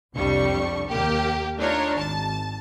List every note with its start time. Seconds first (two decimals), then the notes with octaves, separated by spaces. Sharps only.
0.13 C2 F2 G3 D4 C#6
0.88 D#2 A#3 G4
1.58 A3 D4 D#4 F4 A#4 C#5
1.94 G#1 A5